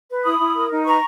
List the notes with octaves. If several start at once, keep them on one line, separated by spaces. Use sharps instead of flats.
B4
E4 B5 D#6
E4
A#4
D#4
B4 A#5 C#6